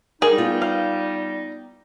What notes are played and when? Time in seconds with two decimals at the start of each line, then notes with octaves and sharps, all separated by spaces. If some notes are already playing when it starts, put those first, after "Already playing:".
0.22 G3 D#4 G#4 A#4
0.38 B3 F4
0.62 F5